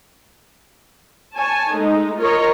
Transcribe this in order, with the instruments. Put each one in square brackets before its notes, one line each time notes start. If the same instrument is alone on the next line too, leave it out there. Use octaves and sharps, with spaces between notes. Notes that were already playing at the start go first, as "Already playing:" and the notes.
[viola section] C#5 G#5 A5
G#3 A3 D#4
F4 A#4 C#5 D#5